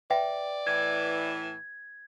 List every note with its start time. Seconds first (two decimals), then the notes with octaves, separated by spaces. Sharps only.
0.10 B4 D5 E5 G5
0.67 A2 E3 G#6